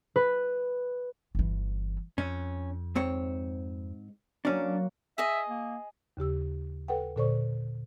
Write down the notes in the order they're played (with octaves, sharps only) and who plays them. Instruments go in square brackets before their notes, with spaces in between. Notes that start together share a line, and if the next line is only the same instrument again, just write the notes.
[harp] B4
[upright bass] G1 E3
[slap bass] F2 [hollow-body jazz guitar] C#4
[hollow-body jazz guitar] G#2 C4 C#5
[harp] F#3 A#3 F#4 [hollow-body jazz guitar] C#4 D4
[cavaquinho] G#4 D#5 [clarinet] E5
[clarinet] A#3
[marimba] D#2 C#3 G4 E6
A4 B4 F#5 G5
A#2 D3 A4 C5 D5 C#6